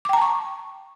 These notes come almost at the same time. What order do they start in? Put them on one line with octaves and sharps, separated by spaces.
D6 G5 A#5 A5 C#6